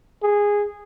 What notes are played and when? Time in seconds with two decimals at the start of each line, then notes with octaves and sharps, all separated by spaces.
0.22 G#4